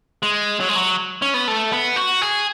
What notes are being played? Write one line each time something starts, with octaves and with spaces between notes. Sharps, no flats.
G#3
F#3
G#3
F#3
C#4
B3
A3
B3
F#4
G#4